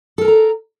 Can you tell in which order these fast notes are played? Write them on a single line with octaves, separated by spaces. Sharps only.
A4 A#4 A5 A#5